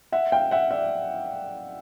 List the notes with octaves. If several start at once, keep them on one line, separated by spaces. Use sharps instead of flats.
E5 F#5
F5 G5
E5 F#5
D5 E5